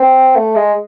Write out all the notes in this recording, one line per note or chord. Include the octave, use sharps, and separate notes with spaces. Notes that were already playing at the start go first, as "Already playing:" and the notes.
Already playing: C4
A3
G#3